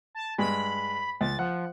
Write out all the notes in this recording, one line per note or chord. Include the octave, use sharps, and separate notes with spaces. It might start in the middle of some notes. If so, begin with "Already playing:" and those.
A5
G2 G#3 B5
C#2 A6
F3 F#5